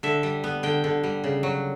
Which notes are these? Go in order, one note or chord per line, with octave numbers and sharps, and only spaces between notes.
D3 E5
G3
B3
D3 G5
D3
G3
C#3
F#3